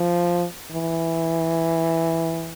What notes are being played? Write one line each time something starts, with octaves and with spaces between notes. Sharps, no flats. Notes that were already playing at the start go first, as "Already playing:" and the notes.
Already playing: F3
E3